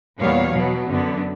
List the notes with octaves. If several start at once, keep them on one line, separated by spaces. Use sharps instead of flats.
E2 A#2 G3 B3 C#5 F5
B2 F#3 B3
F#2 D3 B3